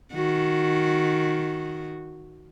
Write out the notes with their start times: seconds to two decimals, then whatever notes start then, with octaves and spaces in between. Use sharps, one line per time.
0.13 D#3 F#4